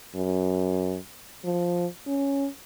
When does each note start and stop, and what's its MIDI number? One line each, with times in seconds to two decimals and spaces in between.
0.15 0.99 42
1.44 1.87 53
2.07 2.48 61